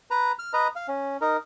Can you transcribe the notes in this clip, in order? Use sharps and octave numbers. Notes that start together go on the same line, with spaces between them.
B4 A#5
F6
B4 D#5 A#5
F5
C#4
D#4 A#4